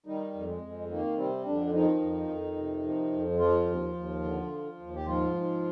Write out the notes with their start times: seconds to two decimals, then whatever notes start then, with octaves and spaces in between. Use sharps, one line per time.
0.06 D#3 G3 D#4
0.34 F2
0.47 G#3
0.62 F2
0.89 D#3 A#3
1.17 C3 G3 C4
1.45 F2 D3 D4
1.73 D#3 F3 D#4
2.01 F2
2.28 F2
2.57 C3
2.84 F3
3.12 F2
3.39 F3 F4
3.67 D#2
3.95 D#2
4.24 D3
4.51 F3
4.79 D#2
4.95 G4
5.06 G#2 F3 F4
5.34 G#2